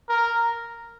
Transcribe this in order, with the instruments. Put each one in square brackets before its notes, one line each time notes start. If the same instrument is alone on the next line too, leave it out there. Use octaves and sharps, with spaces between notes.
[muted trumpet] A#4